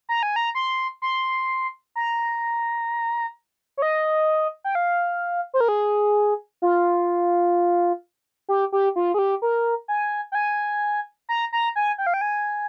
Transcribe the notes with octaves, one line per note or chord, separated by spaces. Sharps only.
A#5
G#5
A#5
C6
C6
A#5
C#5
D#5
G5
F5
C5
A#4
G#4
F4
G4
G4
F4
G#4
G4
A#4
G#5
G5
G#5
A#5
A#5
G#5
G5
F5
G5
G#5